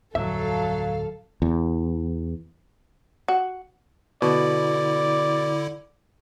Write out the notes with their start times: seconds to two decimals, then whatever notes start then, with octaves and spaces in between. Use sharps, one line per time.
0.15 D1 F2 F#3 A4 E5 F5
1.42 E2
3.28 F#4
4.22 B2 D3 E4 D5